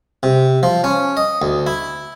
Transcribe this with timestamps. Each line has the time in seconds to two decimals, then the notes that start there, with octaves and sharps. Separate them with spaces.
0.23 C3
0.63 F3
0.84 C#4
1.17 D#5
1.42 D2
1.67 E4